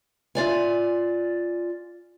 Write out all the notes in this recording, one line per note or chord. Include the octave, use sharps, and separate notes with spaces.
F4 D5 G#5